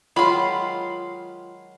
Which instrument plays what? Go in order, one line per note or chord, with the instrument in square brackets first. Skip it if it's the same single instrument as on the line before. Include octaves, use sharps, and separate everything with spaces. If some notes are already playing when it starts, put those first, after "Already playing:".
[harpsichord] D#3 F#3 G#3 [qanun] F4 [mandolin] B5 C6